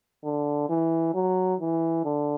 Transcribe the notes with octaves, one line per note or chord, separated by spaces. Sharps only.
D3
E3
F#3
E3
D3